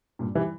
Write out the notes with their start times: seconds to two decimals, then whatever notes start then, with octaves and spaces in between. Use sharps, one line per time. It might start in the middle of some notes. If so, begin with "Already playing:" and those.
0.19 G2 A#2
0.35 E3 G3